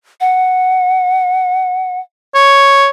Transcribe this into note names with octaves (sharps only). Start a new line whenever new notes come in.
F#5
C#5